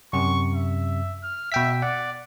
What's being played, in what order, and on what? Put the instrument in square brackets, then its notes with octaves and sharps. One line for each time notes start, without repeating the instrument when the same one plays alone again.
[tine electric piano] F#2 C3 [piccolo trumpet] C#6
[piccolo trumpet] E5
F6
[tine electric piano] B2 G5 B6 [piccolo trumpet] E5
[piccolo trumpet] D5 [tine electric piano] F#5